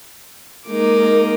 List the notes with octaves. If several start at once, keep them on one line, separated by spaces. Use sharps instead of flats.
G#3 A#3 D#4 D6